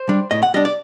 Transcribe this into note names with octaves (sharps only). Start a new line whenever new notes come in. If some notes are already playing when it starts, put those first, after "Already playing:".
Already playing: C5
G3 D4
A2 D#5
F#5
G3 D4 D#5
D5